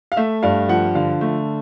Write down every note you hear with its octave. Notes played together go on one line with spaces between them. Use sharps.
F5
A3 E5
G2 F5
F3 F#5
D3 F5
A3